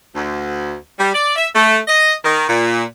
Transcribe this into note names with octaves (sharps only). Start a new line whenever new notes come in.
D2
G3
D5
E5
A3
D#5
D#3
A#2